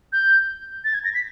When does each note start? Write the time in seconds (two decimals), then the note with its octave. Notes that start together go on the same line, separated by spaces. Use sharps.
0.13 G6
0.84 A6
0.94 G#6
1.05 A#6
1.14 B6